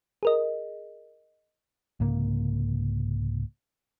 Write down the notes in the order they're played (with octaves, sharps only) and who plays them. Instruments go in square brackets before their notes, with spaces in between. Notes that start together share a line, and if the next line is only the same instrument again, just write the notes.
[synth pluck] G#4 A#4 D#5
[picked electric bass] C2 G#2 C#3 A#3